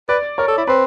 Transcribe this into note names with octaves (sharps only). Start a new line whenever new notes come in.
B4 D5
A#4 C#5
A4
E4
C4 B4